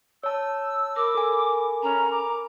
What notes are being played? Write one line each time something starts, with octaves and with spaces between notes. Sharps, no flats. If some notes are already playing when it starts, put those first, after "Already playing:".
C#5 A5 E6
A#4 B5 D6
A4 G#5
C#4 A#5
D6